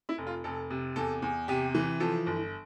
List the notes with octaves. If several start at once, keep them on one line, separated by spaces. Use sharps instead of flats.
E4
F1
F4
F1 A4
C3
E2 A4
E2
C3 G4
E3
F3 A4
G1